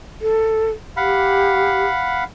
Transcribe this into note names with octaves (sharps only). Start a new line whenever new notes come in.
A4
G4 F5 F#5 B5